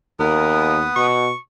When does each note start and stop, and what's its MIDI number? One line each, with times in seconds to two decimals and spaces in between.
0.20 0.88 39
0.20 1.07 59
0.20 0.75 70
0.20 1.07 71
0.20 1.07 87
0.96 1.30 47
0.96 1.38 85